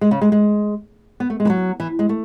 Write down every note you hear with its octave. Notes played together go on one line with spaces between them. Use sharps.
G#3
C#3
G#3
G#3
B3
A3
G#3
E3
F#3
E3
G#3
A3